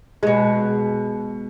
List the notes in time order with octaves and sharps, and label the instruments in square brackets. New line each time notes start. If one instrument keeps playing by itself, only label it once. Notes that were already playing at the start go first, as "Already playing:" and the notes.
[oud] B2 G#3